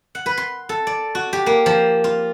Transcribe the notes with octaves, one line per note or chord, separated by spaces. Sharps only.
F#5
B4
C6
A4
D5
F#4
G4
A#3
F3
F4